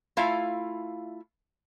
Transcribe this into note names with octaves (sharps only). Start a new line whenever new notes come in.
A3 E4 F4 F5